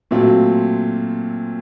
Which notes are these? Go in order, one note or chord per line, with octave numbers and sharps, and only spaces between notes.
A#2 F#3 A3 C4 F4